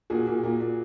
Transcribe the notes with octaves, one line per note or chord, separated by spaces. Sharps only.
A#2 F#4 G#4
A#2
A#2
A#2